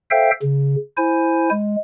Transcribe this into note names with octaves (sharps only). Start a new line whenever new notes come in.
A4 C5 E5 F5 G5
C#3
E4 C5 G#5
G#3